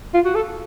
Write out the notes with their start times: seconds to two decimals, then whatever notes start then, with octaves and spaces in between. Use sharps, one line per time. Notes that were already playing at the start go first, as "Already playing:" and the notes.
0.14 F4
0.25 F#4
0.35 A4